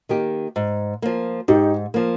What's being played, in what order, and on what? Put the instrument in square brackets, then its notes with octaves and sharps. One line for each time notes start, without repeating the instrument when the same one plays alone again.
[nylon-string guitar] D#3 A#3 D#4 G4
G#2
F3 A#3
[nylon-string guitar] G#2 [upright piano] D#4 G4
[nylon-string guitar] F3 A#3